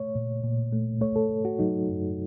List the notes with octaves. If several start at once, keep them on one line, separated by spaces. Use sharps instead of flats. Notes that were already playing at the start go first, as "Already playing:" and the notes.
Already playing: A3 C#5
A#2
A#2
A3
A3 C#5
A4
A3
F#4
F#3 D#4
F#2